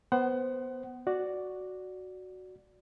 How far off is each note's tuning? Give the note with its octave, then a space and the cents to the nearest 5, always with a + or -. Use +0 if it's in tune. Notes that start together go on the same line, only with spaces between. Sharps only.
B3 +0 C5 +0 F#5 +30
F#4 +0 D5 +0